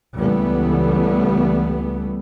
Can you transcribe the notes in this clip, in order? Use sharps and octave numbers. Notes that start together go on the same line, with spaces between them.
C#2 E3 G3 A3 B3